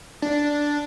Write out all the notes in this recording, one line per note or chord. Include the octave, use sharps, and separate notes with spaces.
D4